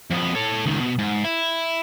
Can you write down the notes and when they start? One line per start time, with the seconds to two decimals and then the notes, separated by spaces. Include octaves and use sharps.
0.10 F2 B3
0.35 A4 C#5
0.66 C#2 D#3
0.80 B2
0.98 G#2
1.24 E4